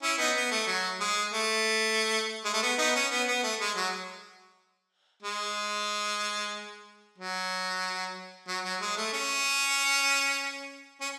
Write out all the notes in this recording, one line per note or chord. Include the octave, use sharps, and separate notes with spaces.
C#4 E4
B3 D#4
B3
A3
F#3
G#3
A3
G#3
A3
B3
B3 D#4
C#4
B3
B3
A3
G#3
F#3
G#3
F#3
F#3
F#3
G#3
A3
C#4
C#4